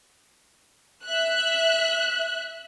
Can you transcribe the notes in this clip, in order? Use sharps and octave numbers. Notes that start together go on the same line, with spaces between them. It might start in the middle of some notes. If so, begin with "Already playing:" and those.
E5 F#6